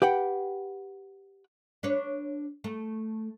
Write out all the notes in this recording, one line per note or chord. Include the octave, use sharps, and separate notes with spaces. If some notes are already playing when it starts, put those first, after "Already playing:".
G4 B4 F#5 G5
D4 B4 C#5
A3